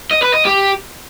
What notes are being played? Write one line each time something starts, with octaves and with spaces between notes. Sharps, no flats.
D#5
B4
D#5
G4